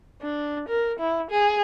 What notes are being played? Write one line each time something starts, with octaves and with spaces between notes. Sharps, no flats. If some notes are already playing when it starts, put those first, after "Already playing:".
D4
A#4
E4
G#4